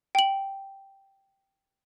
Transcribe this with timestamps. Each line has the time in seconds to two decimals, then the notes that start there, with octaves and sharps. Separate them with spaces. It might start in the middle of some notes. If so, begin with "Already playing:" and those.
0.15 G5 F#7